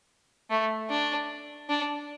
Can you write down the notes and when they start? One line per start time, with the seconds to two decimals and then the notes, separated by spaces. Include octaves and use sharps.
0.50 A3
0.90 D4
1.69 D4